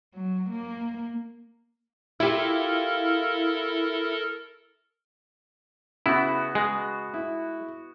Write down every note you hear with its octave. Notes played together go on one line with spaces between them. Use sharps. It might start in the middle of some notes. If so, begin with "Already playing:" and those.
F#3
A#3
E4 F4 G4 A4 A#4
C#3 B3 E4 F#4
G#3
E4